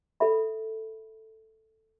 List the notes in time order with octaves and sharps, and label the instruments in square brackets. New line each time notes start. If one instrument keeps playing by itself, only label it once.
[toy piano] A4 E5 B5